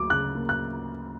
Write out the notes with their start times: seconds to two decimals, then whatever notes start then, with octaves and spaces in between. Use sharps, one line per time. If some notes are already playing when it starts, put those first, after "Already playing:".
Already playing: D2 F#3 A#3 D6
0.10 C#3 F#6
0.35 A#3
0.49 F#6